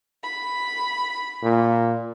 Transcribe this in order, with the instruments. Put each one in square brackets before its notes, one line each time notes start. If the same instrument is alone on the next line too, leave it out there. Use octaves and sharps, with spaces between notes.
[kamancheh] B5
[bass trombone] A#2